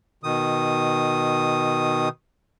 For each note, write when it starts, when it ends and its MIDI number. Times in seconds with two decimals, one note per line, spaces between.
0.23 2.09 47
0.23 2.09 51
0.23 2.09 87